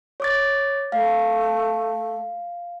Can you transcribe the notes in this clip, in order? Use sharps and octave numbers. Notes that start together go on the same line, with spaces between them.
C#5 D6 A6
A3 F5